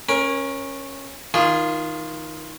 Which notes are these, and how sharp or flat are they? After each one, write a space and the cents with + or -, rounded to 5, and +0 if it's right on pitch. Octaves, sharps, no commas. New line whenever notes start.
C#4 -15 A#4 +25
D#3 +20 F4 -5 G#4 -25